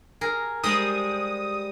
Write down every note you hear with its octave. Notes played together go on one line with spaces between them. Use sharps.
G#4 A#4
G3 G#3 C5 D#6